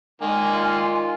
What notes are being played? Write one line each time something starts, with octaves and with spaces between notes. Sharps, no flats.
A#2 D#3 G#3 A#3 G#5
F4